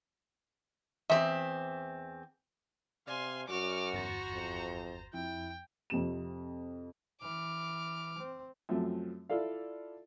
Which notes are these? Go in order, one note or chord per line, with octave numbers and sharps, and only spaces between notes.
E2 C4 E5
C3 D5 F5 G#5 C6
F#2 F#4 C#6 D6 F6
G1 E2 C5 A#5 A6
F2
F2 E4 G5
F2 C3 E7
E3 D6 F6
C4
F#2 F3 A3 C4
E4 F4 A4 D5 F5